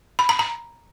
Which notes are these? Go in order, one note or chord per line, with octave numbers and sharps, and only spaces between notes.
B5
A#5
A#5